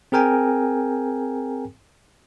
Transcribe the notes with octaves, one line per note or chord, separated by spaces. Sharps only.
C4 G#4 A#4 G5 G#5